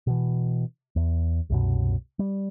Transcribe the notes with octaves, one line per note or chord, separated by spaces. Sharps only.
B2 E3
E2
C2 F#2 B2
G3